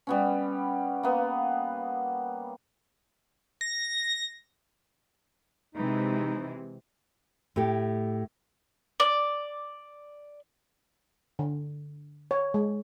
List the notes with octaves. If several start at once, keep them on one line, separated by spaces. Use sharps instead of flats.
G3 B3 C#4
A#3 B3
A#6
C3 E3 G#3 D#4
A2 A3 G4
D5
D3
C#5
G#3